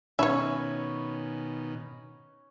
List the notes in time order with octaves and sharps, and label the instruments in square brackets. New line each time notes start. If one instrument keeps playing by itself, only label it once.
[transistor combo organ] B2 D#3 [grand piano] C#4 [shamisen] C#5 E5 [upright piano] G#5 B5 C#6